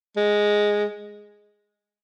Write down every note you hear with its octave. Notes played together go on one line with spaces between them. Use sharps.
G#3